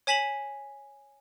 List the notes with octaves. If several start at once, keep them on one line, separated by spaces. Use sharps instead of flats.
C#5 G#5 B6 E7 F#7